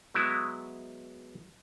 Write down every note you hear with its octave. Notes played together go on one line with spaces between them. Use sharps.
F#3 G#3 B3 E4